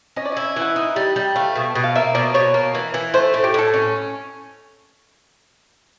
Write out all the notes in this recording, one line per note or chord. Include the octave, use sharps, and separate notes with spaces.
C#4 D#5
D5
D#5
E4
E3
F#5
D#4
G3
G3
A3 F5
B2
B2
F5
A#3 E5
B2 D5
B2 C#5
A#3
E3
E3
A3 C5
A2
G4
A2 A4
C#4